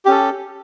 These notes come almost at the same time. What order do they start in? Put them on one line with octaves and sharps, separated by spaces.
G4 C#4 A4